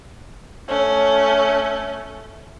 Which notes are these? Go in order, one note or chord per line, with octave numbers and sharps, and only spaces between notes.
A3 C#4